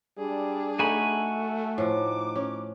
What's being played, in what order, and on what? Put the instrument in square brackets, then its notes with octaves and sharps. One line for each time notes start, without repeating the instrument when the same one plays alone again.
[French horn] G3 [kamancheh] D4 G#4
[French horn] A3 [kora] D#4 [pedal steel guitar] F#4 G#5 B5
[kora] A2 F3 [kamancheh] D#4 D6
[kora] C#4